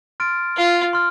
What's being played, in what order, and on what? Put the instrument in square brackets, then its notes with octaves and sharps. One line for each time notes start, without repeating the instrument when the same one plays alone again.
[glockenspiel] C6 F6 A6 D7
[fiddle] F4
[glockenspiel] C6 F6